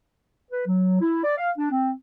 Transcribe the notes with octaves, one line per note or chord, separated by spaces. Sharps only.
B4
F#3
E4
D5
F5
D4
C4